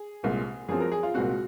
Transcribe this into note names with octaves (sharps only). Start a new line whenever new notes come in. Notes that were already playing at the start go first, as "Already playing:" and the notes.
Already playing: G#4
C2 A#2 G#3 C4
F#2 F3 C4 G#4
A#4
G#4
F4
C2 A#2 G#3 C4 F#4